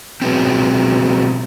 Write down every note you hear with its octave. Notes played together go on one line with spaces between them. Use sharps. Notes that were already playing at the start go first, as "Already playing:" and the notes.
B2 D#3 F#3 G#3 B3 C4